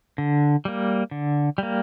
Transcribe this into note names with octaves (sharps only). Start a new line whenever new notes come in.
D3
G3 A#3
D3
G3 A#3